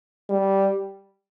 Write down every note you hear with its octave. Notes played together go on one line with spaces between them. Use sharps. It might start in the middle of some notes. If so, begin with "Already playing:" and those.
G3